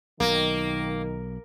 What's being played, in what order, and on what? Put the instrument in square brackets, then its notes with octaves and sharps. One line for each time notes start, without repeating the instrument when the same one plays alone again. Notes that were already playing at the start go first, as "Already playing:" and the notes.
[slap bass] B1 [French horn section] D#3 [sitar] A#3